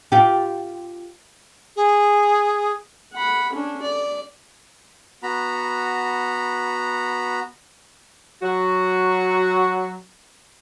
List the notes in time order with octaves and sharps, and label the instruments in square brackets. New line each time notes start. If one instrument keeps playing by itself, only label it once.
[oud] F4 G4
[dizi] G#4
[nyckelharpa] F#5 B5
C#4 D4
D5
[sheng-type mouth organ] B3 F#4 A#5 B5
[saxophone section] F#3 F#4